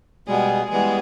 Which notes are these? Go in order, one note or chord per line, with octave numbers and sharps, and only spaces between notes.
B2 G3 G#3 B3 G#4
E3 G3 G#3 B3 G#4